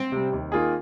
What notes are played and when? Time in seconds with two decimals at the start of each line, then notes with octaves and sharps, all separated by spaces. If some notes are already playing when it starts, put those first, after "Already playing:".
Already playing: C4
0.12 C3 G3
0.33 D#2
0.52 D#3 A#3 F4 G#4